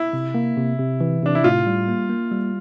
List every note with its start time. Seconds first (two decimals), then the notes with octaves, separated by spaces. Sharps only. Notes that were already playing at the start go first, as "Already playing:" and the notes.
Already playing: E4
0.13 C3
0.34 A#3
0.57 C3
0.79 C3
1.01 E3
1.22 C3 D4
1.35 E4
1.44 A2 F4
1.67 G3
1.88 A#3
2.10 A#3
2.32 G3